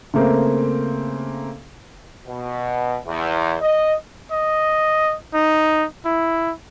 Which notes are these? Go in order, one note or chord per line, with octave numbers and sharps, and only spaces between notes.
C#3 A3 A#3 C4
B2
E2
D#5
D#5
D#4
E4